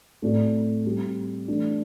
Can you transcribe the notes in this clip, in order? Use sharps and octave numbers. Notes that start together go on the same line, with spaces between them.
A2 A3 C4 A4 D5
G3 C4 G4
E3 A3 D4